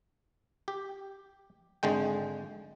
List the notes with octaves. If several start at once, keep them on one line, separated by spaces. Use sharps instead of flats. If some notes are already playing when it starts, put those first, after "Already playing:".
G4
G#1 D3 G#3 G5